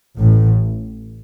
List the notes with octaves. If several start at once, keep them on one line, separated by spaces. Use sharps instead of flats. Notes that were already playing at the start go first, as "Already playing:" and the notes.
A1 A2